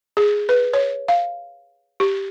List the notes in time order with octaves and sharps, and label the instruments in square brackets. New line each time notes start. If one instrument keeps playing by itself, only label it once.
[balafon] G#4
B4
C#5
F5
G4